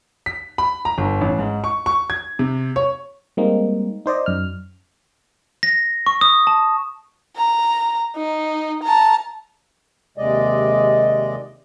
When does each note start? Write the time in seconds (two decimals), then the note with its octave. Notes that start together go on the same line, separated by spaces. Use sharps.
0.26 B6
0.58 B5
0.85 A#5
0.98 G1
1.21 A1
1.39 G#2
1.64 C#6
1.86 C#6
2.10 G#6
2.39 C3
2.76 C#5
3.37 G3 G#3 A#3 C4 D#4
4.06 D#4 C5 D5 D#5
4.26 F#2 F6
5.63 A#6
6.07 C#6
6.21 D#6
6.47 A5
7.36 A#5
8.16 D#4
8.83 A5 A#5
10.18 D#2 C3 G#3 D5 D#5